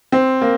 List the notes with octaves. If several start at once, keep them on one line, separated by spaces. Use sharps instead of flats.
C4
A#3